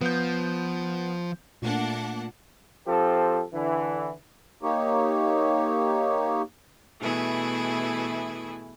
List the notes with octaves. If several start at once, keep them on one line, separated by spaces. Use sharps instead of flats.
F3 B3 G6
A#2 A3 A#3 D4 F#5
F3 C4 G4 A4
D3 E3
A#3 D#4 G4 C#5
B2 E3 A3 E4 G#4